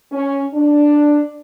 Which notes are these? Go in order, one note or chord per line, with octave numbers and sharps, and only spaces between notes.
C#4
D4